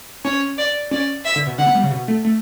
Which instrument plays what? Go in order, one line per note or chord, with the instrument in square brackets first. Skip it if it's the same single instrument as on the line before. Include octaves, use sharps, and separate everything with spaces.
[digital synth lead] C#4 [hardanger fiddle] C#5
[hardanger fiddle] D5
[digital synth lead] C#4 [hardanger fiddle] D5
[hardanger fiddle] E5
[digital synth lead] D3
B2
[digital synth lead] D3 [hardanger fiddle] F#5
[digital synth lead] B3
G3
C#3
B2
A3
A3